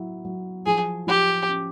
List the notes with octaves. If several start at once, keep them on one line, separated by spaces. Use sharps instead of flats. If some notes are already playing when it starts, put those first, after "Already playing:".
Already playing: F#3 E4
F#3
F3 G#4
F3 G4
C#4